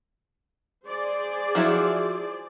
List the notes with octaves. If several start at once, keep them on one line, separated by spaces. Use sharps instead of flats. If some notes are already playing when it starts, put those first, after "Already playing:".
G#4 C5 D5
F3 F#3 E4